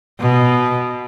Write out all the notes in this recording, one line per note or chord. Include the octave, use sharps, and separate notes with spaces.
B2